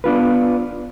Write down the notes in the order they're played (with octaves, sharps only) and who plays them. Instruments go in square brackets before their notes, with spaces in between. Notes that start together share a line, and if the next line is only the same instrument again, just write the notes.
[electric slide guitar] B3 D4 F4 B4